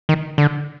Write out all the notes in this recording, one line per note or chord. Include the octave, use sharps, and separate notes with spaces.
D#3
D3